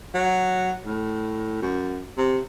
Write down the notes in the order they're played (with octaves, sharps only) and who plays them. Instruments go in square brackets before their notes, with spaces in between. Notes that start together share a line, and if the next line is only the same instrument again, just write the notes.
[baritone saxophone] F#3
A2
F#2
C3